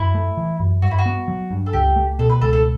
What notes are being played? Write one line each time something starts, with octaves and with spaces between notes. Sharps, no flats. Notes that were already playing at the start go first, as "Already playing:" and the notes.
Already playing: F#2 E4
A3
E3
F#2
G2 F#4
E4
F#4
B3
F#3
G2
A4
C#2 G4
A3
B2 A4
B4
C#2 A4
A4